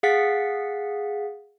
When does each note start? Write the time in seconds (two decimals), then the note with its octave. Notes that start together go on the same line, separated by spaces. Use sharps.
0.03 G#4 F5 F#5 A6 B6